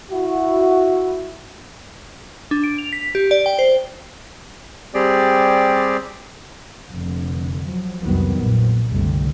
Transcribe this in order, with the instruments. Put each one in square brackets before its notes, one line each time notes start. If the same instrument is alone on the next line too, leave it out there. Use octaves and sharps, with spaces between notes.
[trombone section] E4 F#4
[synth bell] D4
D7
F7
B6
G4
D5
G5
C5
[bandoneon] G3 C4 G4 G#4 D5
[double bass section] F1 D3
F3 F#3
C2 F2 D#3 F#3 G3 B3
A#1 F2
F#1 C2 G2 D3 G3 A3